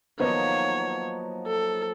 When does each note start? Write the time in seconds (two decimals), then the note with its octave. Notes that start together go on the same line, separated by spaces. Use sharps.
0.20 D#3 F3 F#3 A#3 B3 D#4 C#5
1.47 A4